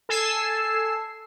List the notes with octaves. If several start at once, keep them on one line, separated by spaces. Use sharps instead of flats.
A4 G#5 E6 C7